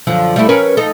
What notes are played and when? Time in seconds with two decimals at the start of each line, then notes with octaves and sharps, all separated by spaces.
0.07 F#2 D3 F3
0.36 G3 A3 E4
0.49 C#4 A#4 B4
0.77 D#4 A4